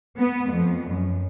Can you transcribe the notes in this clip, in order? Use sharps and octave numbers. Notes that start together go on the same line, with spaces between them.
B3
F2
F#2